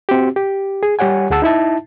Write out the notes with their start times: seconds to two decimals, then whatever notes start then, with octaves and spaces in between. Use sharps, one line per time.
0.09 C4 F#4 G4
0.36 G4
0.83 G#4
0.99 G3 G4 C#5 F#5 G#5
1.30 D2 G#4 F#5 A5 E6
1.42 D#4 E4 E5 A5